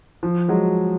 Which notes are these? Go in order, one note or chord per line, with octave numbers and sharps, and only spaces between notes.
F3
F#3 G#3